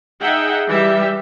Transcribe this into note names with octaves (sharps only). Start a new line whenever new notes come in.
D#4 G#4 E5 F#5 G5
E3 G3 G4 E5